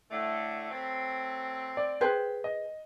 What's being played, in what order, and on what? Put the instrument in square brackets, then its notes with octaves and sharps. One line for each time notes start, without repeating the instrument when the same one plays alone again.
[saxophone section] A2 D3 A3
F#3 A3 C4
[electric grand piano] D5
[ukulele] G#4 B4 C5 [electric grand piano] G5
[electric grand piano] D#5